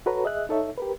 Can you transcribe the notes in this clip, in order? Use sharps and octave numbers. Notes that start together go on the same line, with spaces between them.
F#4 A4 B4 C#5 A#5
G#4 D#5 E5 F#6
D#4 A4 C#5 E5
G4 A#4 B4